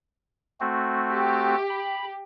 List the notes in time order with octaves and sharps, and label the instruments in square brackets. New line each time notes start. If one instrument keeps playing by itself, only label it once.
[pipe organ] A3 C4 F#4
[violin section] G4
[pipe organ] B5